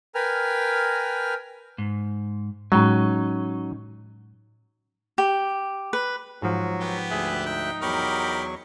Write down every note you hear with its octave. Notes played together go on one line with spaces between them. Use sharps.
A#4 B4 G5 G#5 F6
G#2
A2 F#3 G#3 C#4 D#4
G4
B4
G#2 F3 F#3 F#4
B3 G4
D2 G#4 E5 F#6
D#4 G5
E2 F#3 G4 A#4 B5 C#6